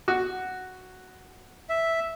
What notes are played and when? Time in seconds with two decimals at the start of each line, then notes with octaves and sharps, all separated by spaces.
0.08 F#4
1.69 E5